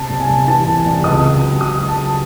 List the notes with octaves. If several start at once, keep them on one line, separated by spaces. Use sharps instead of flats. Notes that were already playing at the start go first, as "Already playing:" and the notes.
Already playing: C3 A5
C2
G#5
C2
E3 A5
C2
C2
C#2 D#6
C#2
F#3
F#3 D#6
C#2
A5
F#3